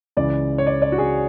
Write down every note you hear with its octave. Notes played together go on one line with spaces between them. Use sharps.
C#2 C#3 E3 D5
C#5
D5
D5
F#4
G#4